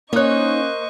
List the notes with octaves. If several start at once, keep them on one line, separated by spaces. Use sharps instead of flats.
A#3 C#4 D#4 C5 C#5 D#5 C#6 F#6